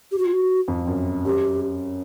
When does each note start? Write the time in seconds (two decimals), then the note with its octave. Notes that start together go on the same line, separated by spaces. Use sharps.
0.12 G4
0.18 F#4
0.26 F4
0.33 F#4
0.68 F2
0.87 F#2
1.25 F#2 G4